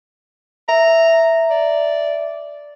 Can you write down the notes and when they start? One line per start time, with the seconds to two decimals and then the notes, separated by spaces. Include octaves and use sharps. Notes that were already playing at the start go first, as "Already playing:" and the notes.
0.69 E5 A#5
1.50 D5